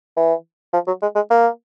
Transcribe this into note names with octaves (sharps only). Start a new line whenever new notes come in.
E3
F3
F#3
G#3
G#3
A#3